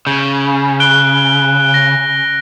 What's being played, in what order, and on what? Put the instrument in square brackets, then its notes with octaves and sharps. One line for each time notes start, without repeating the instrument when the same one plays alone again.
[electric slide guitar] C#3 [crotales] G6
[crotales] F#6 D7 G7
A#6